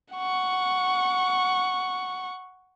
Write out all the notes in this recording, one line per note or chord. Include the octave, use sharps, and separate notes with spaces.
F#5 C#6